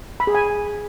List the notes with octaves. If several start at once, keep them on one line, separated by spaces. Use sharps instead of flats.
B5
G#4
G#5